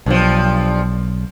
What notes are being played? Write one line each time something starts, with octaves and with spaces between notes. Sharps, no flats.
B1 G2 F3